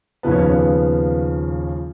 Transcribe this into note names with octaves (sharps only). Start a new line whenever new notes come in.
D#2 C#3 F3 B3
C#4
B3